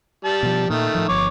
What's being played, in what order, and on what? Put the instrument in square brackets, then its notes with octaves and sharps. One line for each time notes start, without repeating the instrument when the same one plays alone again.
[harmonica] G3 A5
[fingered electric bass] B2 F3
[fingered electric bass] A#2 [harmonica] D#3 A3
[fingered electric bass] A2 F3
[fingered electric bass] G1 F3 [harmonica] C#5 D6